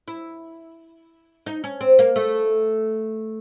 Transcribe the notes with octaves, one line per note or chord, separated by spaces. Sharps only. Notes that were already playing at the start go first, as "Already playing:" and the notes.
E4
D#4
C#4
C4
A#3
A3